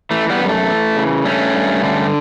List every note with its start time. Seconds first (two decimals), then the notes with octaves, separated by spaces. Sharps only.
0.11 E3 A3
0.30 G3 B3
0.40 F#2 G3
0.49 A3
0.68 E3
0.96 C#3
1.25 G2 A3 C#4
1.54 G2
1.83 D3